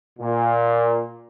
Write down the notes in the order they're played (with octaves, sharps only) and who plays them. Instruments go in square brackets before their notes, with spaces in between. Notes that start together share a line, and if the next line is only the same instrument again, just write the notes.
[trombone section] A#2